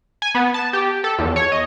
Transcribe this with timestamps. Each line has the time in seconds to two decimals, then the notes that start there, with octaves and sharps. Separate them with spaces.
0.22 G#5
0.35 B3
0.54 A5
0.73 G4
1.04 A4
1.18 E2
1.36 C#5
1.52 D#5